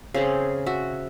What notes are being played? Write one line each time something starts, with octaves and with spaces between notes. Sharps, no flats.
C#3 C4 G#4
F#4 E5